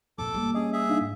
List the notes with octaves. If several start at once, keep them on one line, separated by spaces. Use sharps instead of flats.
F2 A#2 A4 D6
G3 A#3
C#4 G#4 D#5
G#4 E5
D4 D#4 F5
G#2